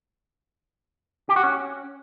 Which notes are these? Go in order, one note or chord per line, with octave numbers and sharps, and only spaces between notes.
G4
F#4
C#4